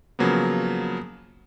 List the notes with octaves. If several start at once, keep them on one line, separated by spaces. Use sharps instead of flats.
C#3 F3 F#3 A#3 B3